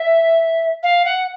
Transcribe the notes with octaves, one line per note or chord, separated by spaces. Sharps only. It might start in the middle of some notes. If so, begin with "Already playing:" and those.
Already playing: E5
F5
F#5